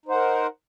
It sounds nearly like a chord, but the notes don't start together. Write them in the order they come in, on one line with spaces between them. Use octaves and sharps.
D#4 C5 F#5 A#4